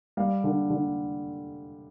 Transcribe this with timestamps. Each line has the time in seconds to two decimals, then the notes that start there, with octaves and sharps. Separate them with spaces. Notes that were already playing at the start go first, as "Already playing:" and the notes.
0.17 G3 F5
0.44 D3
0.70 D3